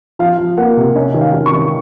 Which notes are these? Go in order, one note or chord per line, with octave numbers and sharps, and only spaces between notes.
F3 F5
F3
A#3 F#5
C3
C#4 D#5
D#3
F5
D#3
C#6
D#3